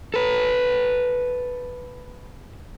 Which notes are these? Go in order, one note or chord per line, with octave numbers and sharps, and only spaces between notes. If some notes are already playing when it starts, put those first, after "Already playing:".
A4 B4